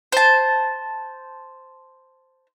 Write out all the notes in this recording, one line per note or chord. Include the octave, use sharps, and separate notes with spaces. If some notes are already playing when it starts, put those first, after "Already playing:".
C5 A5